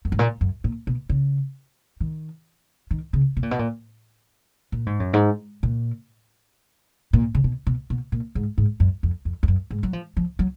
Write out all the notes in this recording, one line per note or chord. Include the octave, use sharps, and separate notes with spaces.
F#2
G#2
A#2
F#2
A#2
B2
C#3
D#3
D#3
C#3
B2
A#2
B2
A#2
A#2
G#2
F#2
G#2
A#2
A#2
C#3
B2
B2
B2
A#2
G#2
G#2
F#2
F2
F2
F2
F#2
G#2
F#3
F3
F3
F#3